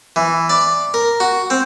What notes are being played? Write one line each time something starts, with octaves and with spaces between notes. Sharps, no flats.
E3
D5
A#4
F#4
C4